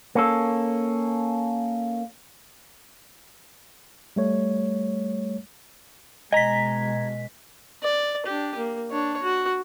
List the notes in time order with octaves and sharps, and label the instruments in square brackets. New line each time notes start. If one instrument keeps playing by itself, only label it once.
[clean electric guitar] A#3 C#4 A4
[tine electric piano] G3 A3 C#5
[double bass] B2 G#3 [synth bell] D#5 B6 [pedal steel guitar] G#5 A#5
[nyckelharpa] D5
D4 G4
A#3
D4 C#5
F#4